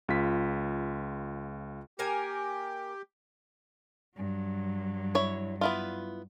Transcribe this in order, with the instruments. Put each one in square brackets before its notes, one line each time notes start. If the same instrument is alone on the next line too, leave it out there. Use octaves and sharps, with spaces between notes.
[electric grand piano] C#2 F4 B6
[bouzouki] A#3 A#4 G#5 [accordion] G4
[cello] G2 F#3
[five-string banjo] E4 C#5
B3 E4 F4